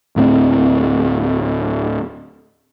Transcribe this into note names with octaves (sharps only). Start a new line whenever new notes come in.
D1 A2 A3 C4